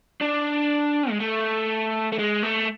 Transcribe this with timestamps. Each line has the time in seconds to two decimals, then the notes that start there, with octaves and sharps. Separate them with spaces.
0.21 D4
1.10 G#3
1.20 A3
2.12 A3
2.19 G#3
2.43 A3